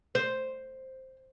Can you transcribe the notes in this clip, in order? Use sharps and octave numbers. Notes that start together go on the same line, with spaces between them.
C5